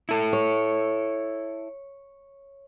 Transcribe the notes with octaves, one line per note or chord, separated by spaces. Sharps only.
E4 A4
C#5